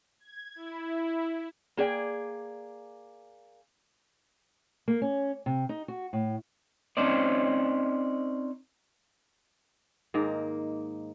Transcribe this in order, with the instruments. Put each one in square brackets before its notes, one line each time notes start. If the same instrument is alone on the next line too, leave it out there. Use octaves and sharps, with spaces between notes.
[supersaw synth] G#6
E4
[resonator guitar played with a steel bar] A#3 G#4 D5 G5
[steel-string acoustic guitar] A#3
C#4
C3
D#4
F#4
A2
[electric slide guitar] C4 C#4 D#4 C5 D5
[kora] G#2 D#3 A#3